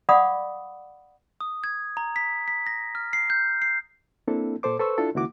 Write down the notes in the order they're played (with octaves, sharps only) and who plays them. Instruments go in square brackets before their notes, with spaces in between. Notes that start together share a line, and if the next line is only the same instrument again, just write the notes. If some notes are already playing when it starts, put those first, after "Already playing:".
[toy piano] D5 F5 F#5 B5 D6 D#6
[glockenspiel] D#6
G#6
A#5
B6
B6
A#6
F6
C7
G6
C7
[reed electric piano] A#3 C4 D4 E4 A4
A#2 A4 C5 D6
A4 B4 C5 C#6 E6
D4 E4 F4 A4
C#2 D#3 A#3 E4 F#4 D6